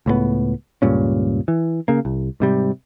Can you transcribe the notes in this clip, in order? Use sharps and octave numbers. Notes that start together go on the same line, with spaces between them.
C#2 A2 G3 B3
C#2 G2 A#2 C#4
E3
C#3 A#3
C2
G#2 C3 G3